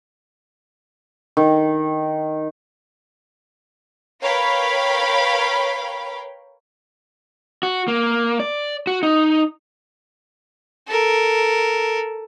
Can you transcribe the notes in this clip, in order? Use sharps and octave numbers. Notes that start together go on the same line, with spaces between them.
D#3
A#4 B4 C#5 F5 G5 B5
F#4
A#3
D5
F#4
D#4
A4 A#4